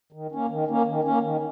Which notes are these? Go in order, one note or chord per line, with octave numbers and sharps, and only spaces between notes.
D#3
A#3 C#4
D#3
A#3 C#4
D#3
A#3 C#4
D#3